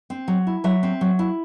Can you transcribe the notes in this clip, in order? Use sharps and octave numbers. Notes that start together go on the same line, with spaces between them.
C4
F#3
E4
F#3 E5
C4
F#3
E4